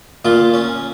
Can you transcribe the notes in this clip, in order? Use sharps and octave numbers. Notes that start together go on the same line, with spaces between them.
A#2 F4
C#4